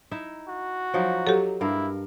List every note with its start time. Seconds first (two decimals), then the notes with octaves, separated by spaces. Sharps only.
0.11 D#4 E4 E5
0.48 F#4
0.94 F3 F#3 D#4
1.27 F#3 G4 A4
1.61 G2 E4 A#4 F5